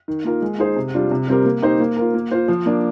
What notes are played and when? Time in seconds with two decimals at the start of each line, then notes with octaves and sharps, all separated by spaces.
0.08 D#3
0.25 A#3 F4 A#4
0.42 G#3
0.59 D#4 G#4 C5
0.76 C3
0.94 G3 D4 F4
1.11 C3
1.27 G3 C4 G4 A#4
1.45 A#3
1.62 D#4 G4 C5
1.80 A#3
1.97 F4 A#4
2.14 A#3
2.31 F4 C5
2.48 F3
2.66 A#3 D4